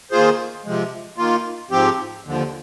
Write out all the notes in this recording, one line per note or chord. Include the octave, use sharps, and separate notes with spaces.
D#3 A#3 F4 G#4 C5
C3 F3 G#3
D#3 A#3 F4
G#2 F3 C4 G4
D#2 D3 F3